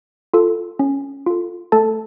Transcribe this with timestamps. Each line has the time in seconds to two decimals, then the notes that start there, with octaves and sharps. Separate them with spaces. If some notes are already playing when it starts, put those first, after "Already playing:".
0.34 F4 A4
0.79 C#4
1.26 F4 A4
1.72 A3 A4 A5